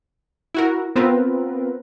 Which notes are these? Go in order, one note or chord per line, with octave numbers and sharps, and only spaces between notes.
E4 F#4 A#4
B3 C4 F4 A#4 B4